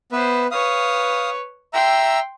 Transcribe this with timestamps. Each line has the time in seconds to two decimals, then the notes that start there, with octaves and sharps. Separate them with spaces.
0.12 B3 B4 C5 E5
0.51 B4 C#5 F5 D#6
1.73 E5 G5 A#5 C6 E6